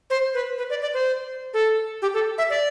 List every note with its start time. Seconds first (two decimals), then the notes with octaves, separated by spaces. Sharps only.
0.10 C5
0.34 B4
0.58 B4
0.70 D5
0.82 D5
0.94 C5
1.54 A4
2.02 G4
2.14 A4
2.38 E5
2.50 D5